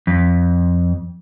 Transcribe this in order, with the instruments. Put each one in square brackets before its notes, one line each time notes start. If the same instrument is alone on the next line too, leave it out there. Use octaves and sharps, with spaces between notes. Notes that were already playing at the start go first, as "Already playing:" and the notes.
[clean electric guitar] F2